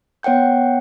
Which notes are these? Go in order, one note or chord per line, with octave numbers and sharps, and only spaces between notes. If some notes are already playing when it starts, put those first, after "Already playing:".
B3 C#5 F#5 G5 G6